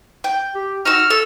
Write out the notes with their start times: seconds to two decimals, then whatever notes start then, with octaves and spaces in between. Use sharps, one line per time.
0.24 G5
0.55 G4
0.85 D#4 F#4 E6 F6
1.10 A4 E6